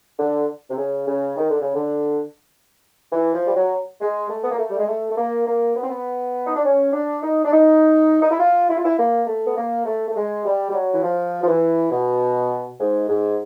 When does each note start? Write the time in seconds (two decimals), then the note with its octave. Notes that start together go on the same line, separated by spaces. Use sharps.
0.19 D3
0.70 C3
0.78 C#3
1.08 C#3
1.37 D#3
1.50 D3
1.62 C#3
1.75 D3
3.12 E3
3.34 F3
3.47 G3
3.56 F#3
4.01 G#3
4.30 A3
4.43 B3
4.52 A#3
4.59 A3
4.70 G3
4.79 G#3
4.88 A3
5.10 A3
5.18 A#3
5.46 A#3
5.76 B3
5.83 C4
5.90 B3
6.46 D#4
6.56 D4
6.64 C#4
6.93 D4
7.23 D#4
7.45 D4
7.51 D#4
8.22 D#4
8.31 E4
8.40 F4
8.69 E4
8.77 F4
8.85 E4
8.99 A#3
9.27 A3
9.47 B3
9.57 A#3
9.86 A3
10.08 A3
10.16 G#3
10.45 G3
10.70 G3
10.74 F#3
10.94 E3
11.03 F3
11.43 F3
11.48 E3
11.91 B2
12.80 G#2
13.09 G#2